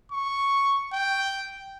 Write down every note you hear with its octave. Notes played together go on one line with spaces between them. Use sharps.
C#6
G5